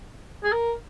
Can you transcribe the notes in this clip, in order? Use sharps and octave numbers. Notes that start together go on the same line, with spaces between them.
G#4
A#4